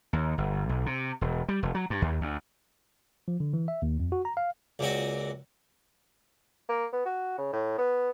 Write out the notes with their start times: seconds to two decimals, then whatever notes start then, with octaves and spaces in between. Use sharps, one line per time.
0.13 D#2
0.38 G1
0.69 B1
0.86 C3
1.21 E1
1.49 G3
1.63 F1
1.75 F#3
1.90 G2
2.02 D#2
2.21 D2
3.28 F3
3.40 D3
3.53 E3
3.68 E5
3.82 D#2
4.00 F2
4.12 F#4
4.25 A#5
4.37 F5
4.79 C#2 A#2 C4 F#4
6.69 A#3
6.93 B3
7.05 F#4
7.38 C#3
7.53 A2
7.78 B3